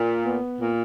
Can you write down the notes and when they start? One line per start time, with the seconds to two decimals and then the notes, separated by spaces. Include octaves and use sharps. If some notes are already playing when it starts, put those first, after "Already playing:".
Already playing: A#2
0.25 B3
0.60 A#2